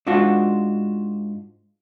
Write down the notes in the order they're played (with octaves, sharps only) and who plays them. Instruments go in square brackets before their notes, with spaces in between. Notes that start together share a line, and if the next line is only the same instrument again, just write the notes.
[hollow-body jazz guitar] G#2 D4 F4 F#4